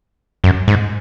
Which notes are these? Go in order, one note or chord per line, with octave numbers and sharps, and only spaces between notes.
F#2
G#2